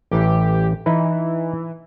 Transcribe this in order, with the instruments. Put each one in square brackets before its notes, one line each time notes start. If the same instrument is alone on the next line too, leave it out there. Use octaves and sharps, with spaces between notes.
[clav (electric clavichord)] A1 E3 [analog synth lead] G4
[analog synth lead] E3 [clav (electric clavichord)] D#4 E4 B4